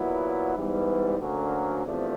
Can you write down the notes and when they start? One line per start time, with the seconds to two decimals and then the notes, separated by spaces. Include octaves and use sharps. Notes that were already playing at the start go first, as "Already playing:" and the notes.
Already playing: A#2 F#3 B3 E4
0.55 G#2 E3 G3 B3
1.19 D2 D3 F#3 A#3 C#4
1.84 E2 C3 F3 A3 D4